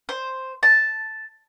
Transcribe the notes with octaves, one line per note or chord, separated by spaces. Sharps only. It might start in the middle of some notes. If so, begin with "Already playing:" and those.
C5
A5